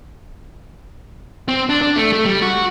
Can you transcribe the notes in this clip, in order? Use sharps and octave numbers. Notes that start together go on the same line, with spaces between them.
C4
D4
D4
A3
A3
G3
F#4